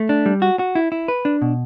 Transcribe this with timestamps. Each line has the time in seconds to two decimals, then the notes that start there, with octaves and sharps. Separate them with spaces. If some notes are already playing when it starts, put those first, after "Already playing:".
Already playing: A3
0.09 D4
0.26 G3
0.42 F#4
0.59 F#4
0.75 E4
0.92 E4
1.08 B4
1.25 D4
1.42 B2